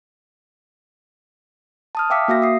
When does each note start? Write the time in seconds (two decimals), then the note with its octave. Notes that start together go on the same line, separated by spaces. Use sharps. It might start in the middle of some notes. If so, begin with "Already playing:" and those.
1.95 A5 D#6 F6
2.10 E5 F5 G5 D6 E6 B6
2.28 A#3 F#4 E5 F5 A#6
2.42 D#6 C7